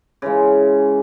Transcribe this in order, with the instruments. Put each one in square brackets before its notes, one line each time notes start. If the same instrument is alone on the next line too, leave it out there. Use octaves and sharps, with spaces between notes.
[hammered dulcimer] C#3 E3 G#3